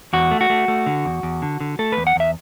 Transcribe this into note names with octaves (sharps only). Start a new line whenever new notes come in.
E2 F#4
A3
F#4
A3
A3
D3
E2
E2
D3
D3
A3 A4
E2 B4
F#5
E2 E5